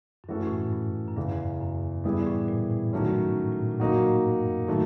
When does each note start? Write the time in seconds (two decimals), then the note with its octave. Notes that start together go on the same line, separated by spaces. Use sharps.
0.24 F#2
0.28 G2 E3 A3 C#4 F#4 A4
0.47 A2
0.60 G#2
0.73 G2
1.08 F#2
1.16 E2 G2 C#3 E3
1.61 F#2
2.04 G2 E3 G3 B3 E4 G#4
2.27 A2
2.48 A#2
2.70 A2
2.93 G2 D#3 F#3 A3 C#4
3.14 G#2
3.37 A2
3.53 A#2
3.59 A2
3.72 A#2
3.80 B2 F#3 A#3 D#4 F#4
4.02 A2
4.15 G#2
4.24 G2
4.36 F#2
4.46 G2
4.68 A2 D#3 F#3 A3